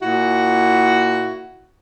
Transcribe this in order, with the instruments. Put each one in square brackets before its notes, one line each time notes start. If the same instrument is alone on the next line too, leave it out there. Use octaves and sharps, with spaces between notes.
[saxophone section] A#2 E4 F#4